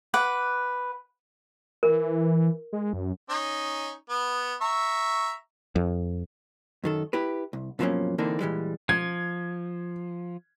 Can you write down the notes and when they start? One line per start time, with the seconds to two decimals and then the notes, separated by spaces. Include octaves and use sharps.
0.14 B4 F#5 D6
1.83 E3 A#4
2.73 G#3
2.93 F#2
3.29 C#4 D#4
4.10 B3
4.62 E5 A#5 C#6
5.76 F2
6.84 F#2 D#3 A4
7.13 E4 G4 B4
7.53 C2
7.79 G2 B2 F3 F#3 A#3 C#4
8.18 D3 E3 A#3 C4 D4 D#4
8.40 A#2 E3 G3 G#3
8.89 F3 G#6